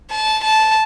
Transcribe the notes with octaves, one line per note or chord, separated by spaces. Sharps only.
A5
A5